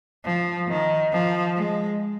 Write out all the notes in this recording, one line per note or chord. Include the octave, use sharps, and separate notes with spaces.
F3
D#3
F3
G#3